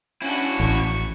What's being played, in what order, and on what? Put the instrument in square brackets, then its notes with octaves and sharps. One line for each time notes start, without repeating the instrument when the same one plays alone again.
[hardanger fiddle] C#4 D4 [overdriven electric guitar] E4 F#4
[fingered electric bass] A1 [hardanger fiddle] C#6